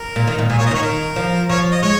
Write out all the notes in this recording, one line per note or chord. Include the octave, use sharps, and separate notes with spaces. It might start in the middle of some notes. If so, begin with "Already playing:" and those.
Already playing: A#4
A#2
D#3
A#2
A#2 G#4
C#5
A#2
D#5
D#3
C#5
D#3 A#4
F3
F3 C#5
D#5
G#3 C#5